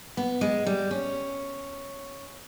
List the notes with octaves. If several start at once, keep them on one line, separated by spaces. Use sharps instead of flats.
B3
G#3
G3
C#4